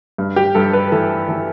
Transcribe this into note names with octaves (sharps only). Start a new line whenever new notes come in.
G2
G4
G2 A4
B4
E3 A4
E3